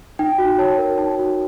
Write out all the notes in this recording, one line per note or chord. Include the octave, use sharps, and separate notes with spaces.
D#4 G5
F#4
C#5 A5
A#4
D#4 A5
F#4